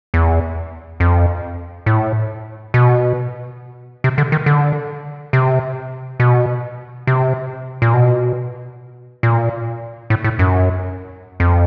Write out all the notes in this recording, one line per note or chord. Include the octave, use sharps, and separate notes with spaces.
E2
F2
A2
B2
C3
D3
D#3
D3
C3
B2
C3
A#2
B2
A#2
A2
A2
F#2
F2